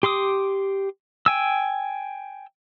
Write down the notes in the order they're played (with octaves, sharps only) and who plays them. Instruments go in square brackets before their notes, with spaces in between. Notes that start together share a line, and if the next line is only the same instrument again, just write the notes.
[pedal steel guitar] G4 C6 D6 D#6
G5 G#5 E6